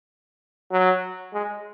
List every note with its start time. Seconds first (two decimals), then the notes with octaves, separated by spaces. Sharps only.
0.72 F#3
1.34 G#3